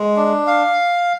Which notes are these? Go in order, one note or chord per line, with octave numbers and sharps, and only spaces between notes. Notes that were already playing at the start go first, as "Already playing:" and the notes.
Already playing: G#3
D4
F5